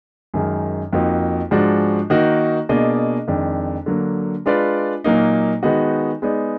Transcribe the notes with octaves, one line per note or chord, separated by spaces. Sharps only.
F#2 D#3 G#3
F2 F3 A#3 D#4 F#4
G#2 F3 G#3 D4 F#4
D#3 A#3 D#4 F#4
B2 A#3 D4 G#4 D#5
F2 D#3 G#3 D4
D3 F#3 A#3
G#3 D4 F4 B4 D5
A#2 F#3 A#3 D#4
D#3 G#3 B3 D#4 F#4
G#3 B3 D#4 G#4 D5